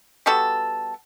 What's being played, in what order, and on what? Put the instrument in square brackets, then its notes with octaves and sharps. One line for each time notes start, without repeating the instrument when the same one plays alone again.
[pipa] G3 B3 F#4 A4